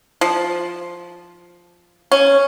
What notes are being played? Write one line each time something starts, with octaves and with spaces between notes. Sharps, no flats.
F3
C#4